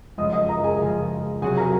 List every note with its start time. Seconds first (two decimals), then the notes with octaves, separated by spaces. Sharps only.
0.18 F#2 C#3 F3 G#3 D#5 D#6
0.33 D#5 D#6
0.49 A#4 A#5
0.64 G#4 G#5
0.80 F#2 C#3 F3 G#3
1.42 C3 F#3 C4 F#4 G#4 G#5
1.57 A#4 A#5